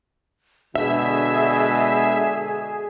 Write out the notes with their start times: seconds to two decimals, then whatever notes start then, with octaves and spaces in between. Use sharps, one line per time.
0.75 B2 D3 G#3 D4 G#4 E5